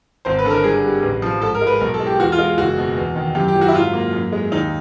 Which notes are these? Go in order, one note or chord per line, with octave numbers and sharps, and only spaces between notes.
G#1 C5
B4
D3 A4
A#4
G2 G#4
G3
A1
F3
G#2 A4
A#4
G#3
B4
B1 A#4
A4
G#3
G4
E2 F#4
F4
G#3
F#1 F#4
B2
E2
D#3
F#2 G4
G4
F#3
F#4
E4
G#2 F4
A#3
F#2
G#3
D#2 D#4